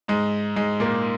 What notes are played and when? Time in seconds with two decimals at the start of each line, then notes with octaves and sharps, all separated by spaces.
0.08 G#2 G#3
0.56 G#2 G#3
0.80 A#2 A#3